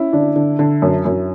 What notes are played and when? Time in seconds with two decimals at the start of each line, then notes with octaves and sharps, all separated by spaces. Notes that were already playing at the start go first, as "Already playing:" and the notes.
Already playing: C#4 E4
0.13 D3 D4
0.36 D3
0.59 D3
0.82 F#2
1.05 F#2